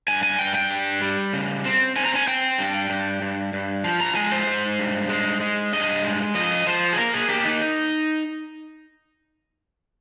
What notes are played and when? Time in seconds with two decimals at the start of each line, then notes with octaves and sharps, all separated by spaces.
0.08 G2 G#5
0.23 G#5
0.39 G2 G5
0.55 G5
0.70 G3
1.02 G3
1.33 C#3
1.65 C4
1.96 C4 G#5
2.05 A#5
2.15 G#5
2.27 C4 G5
2.58 G2
2.90 G2
3.22 G2
3.53 G2
3.84 F3
4.01 A#5
4.15 G#3 G#5
4.32 C5
4.47 G#3
4.78 G2
5.09 G#3
5.41 G#3
5.73 G2 D#5
6.04 G#3
6.35 F3 D#5
6.66 F3 C5
6.93 G#4
6.97 A#3 A#4
7.14 G#4
7.29 A#3 G4
7.45 D#4